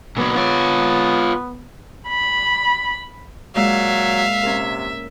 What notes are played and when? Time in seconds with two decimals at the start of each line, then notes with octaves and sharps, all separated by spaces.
0.17 A#2 F#3 B3
0.36 F4 C#5
2.09 B5
3.56 A#2 F#3 G#3 A#3 E5 F5
4.43 C3 C#4 A#4